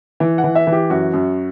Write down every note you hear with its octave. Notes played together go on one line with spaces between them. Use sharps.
E3
F#5
E3
E5
E3
G4
F#2 F#4
F#2